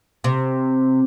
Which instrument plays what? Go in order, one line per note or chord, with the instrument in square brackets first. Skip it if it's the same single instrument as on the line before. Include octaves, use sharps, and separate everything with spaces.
[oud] C3